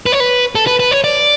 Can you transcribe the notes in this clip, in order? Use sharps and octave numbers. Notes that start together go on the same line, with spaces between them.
B4
C#5
B4
A4
B4
B4
C#5
D5